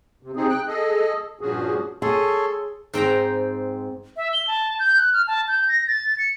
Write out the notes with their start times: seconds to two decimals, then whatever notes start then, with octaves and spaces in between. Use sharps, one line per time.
0.23 C3
0.36 C3 C4 D#4 G#4
0.49 G5 F#6
0.67 G#4 A4 D#5
1.41 G2 A#2 F3 C#4 F#4 G#4
2.02 G#4 A4 C#5 C6
2.94 G#2 C4 G5 A#5
4.16 E5
4.33 G7
4.47 A5
4.79 G6
4.97 F#6
5.13 F6
5.27 A5
5.48 G6
5.68 A#6
5.88 A6
6.18 C#7